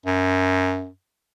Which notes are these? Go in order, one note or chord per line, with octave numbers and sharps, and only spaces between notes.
F#2